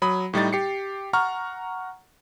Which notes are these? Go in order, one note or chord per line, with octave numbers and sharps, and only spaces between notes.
F#3 B5 D#6
A2 G3 D#4 A6
G4 C7 C#7
F#5 A#5 C#6 F6